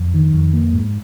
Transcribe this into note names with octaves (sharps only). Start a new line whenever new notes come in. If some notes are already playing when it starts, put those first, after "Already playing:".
Already playing: F2
D#3
F2
A#3
G#2